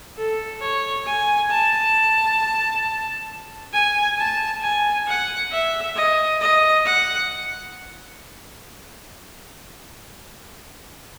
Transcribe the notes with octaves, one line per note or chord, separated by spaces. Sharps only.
A4
C#5
G#5
A5
G#5
A5
G#5
F#5
E5
D#5
D#5
F#5